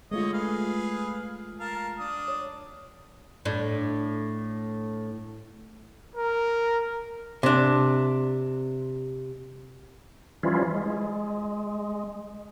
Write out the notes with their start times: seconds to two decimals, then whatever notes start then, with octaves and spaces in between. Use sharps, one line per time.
0.11 D3 G#3 A3 F4 C#5 D#5
0.33 G#4 B4 F5
1.60 A#4 F5 A5
1.99 D4 D#6
2.28 C#5
3.45 A2 D4
6.16 A#4
7.43 C3 D4
10.43 E3 F3 G3 C#4 E4 F4
10.75 G#3